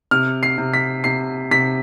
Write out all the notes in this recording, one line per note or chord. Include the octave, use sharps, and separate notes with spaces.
C3 F6
C7
C3
B6
C3 C7
C3 B6